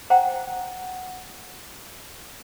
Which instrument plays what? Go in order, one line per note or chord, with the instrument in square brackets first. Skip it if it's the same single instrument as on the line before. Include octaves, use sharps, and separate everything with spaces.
[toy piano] C5 F#5 G5 A#5